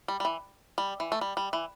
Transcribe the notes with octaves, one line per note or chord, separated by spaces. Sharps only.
G3
G3
E3
G3
E3
A3
G3
G3
E3